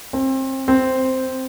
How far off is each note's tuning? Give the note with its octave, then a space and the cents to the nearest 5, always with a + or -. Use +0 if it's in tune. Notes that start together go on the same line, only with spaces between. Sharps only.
C4 +30
C4 -5